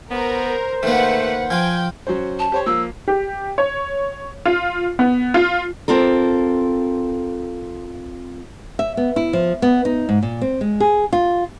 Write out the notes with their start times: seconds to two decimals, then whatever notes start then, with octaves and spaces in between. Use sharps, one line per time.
0.11 B3 A#4 C5
0.83 D#3 A3 A#3 B4 F#5
1.50 F3 F4 G5 G#5
2.07 F#3 C#4 C5
2.39 A5
2.52 G4 C5 C#5
2.66 F3 A#3 E6
3.08 G4
3.58 C#5
4.45 F4
4.99 B3
5.34 F4
5.88 C4 F4 A4 A#4
8.79 E5
8.97 B3
9.16 E4
9.33 F3
9.62 B3
9.85 D#4
10.09 G#2
10.23 A#2
10.41 C4
10.61 G#3
10.80 G#4
11.13 F4